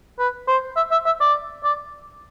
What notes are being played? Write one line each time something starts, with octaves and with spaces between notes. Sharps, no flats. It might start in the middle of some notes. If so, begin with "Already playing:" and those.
B4
C5
E5
E5
E5
D5
D5